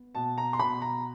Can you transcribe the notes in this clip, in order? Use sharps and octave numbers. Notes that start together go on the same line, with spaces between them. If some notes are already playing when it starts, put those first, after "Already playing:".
Already playing: B3
B2 A5
A#5
C6
B2 B5
A#5